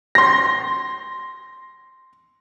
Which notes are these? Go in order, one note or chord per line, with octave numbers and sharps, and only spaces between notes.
C6 A#6